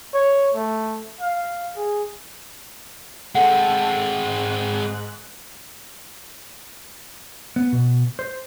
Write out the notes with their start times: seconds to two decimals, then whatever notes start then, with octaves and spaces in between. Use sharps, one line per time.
0.14 C#5
0.55 A3
1.21 F5
1.76 G#4
3.35 G#3 C4 A4 F#5
4.23 G#2 F#6
7.56 B3
7.72 B2
8.19 C5